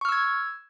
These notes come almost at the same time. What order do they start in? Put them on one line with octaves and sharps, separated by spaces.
C#6 F6 E6 G#6